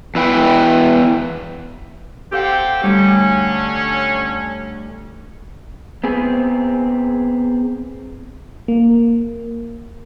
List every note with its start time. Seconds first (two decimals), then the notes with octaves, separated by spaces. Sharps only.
0.15 E2 E4 B4 G5
2.32 C4 G4 A4 F5 F#5
2.83 D2 D3 G3 C#4
6.04 B3 C4 G#4
8.68 A#3